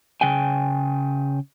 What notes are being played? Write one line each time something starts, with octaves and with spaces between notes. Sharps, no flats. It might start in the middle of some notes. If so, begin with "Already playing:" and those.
C#3 G5 G#5